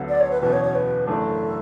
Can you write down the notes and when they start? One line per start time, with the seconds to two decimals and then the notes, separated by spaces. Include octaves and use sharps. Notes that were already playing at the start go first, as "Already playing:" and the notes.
Already playing: D2 D3 F#3 B3
0.09 D5
0.20 C#5
0.31 B4
0.42 E1 E2 B2 F#3 C#4 B4
0.53 C#5
0.64 C#5
0.75 B4
1.07 F#1 F#2 E3 A3 D4 A4